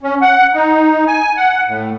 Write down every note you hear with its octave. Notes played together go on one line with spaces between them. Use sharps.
C#4
F#5
D#4
G#5
F#5
A2